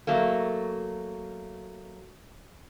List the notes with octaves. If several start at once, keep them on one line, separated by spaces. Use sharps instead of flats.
F#3 A3 A#3